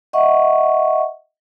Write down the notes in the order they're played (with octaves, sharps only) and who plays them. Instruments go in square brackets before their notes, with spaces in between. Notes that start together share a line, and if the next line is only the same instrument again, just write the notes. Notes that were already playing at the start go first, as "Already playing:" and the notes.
[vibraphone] D#5 E5 F#5 C#6